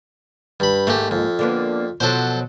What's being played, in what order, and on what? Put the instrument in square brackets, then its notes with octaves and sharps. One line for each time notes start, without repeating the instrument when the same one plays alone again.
[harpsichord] G2 B5
[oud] G#2 A#3 [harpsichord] A3 G4
[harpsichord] F2
[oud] D3 A#3 B3
[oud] B2 F3 F#3 [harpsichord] A4 C5